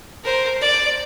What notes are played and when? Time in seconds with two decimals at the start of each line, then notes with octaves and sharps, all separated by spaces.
0.24 A#4 C5
0.61 D5